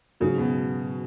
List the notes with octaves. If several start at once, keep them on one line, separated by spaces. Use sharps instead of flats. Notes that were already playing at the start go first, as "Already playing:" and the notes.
G#2 C#3 F#3 D#4 G#4
B2